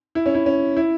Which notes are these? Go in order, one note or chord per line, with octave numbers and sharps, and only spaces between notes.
E4
C#4
E4
C#4
E4